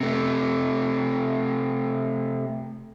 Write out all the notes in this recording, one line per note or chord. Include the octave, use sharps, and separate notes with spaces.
C3 A3